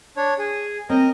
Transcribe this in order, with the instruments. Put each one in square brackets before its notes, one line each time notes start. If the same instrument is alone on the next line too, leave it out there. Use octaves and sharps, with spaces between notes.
[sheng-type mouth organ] D4 C#5
G#4
[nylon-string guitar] C4 [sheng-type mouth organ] A#4 D#5